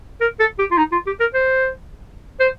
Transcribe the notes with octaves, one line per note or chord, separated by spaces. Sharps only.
A#4
A4
G4
F4
D#4
F4
G4
A#4
C5
C5